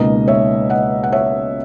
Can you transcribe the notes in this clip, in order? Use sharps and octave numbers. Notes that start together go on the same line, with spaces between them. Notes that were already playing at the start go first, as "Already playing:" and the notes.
Already playing: C#2 B2 A#3 D#4 D#5
C#5 E5
D#5 F#5
F#5
C#5 E5